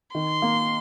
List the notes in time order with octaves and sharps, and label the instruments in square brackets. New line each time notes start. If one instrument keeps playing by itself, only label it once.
[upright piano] D#3 [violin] C6
[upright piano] A#3